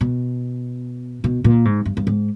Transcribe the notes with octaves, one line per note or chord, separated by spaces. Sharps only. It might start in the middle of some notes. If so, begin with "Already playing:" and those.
B2
B2
A#2
G#2
G2
G2
G#2